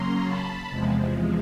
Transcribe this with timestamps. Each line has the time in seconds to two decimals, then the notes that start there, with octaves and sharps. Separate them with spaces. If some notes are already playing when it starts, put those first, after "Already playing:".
Already playing: C#3 F#3 A#3 C#4 A#5 C6
0.24 A5 B5
0.68 E2 C3 F3 G#3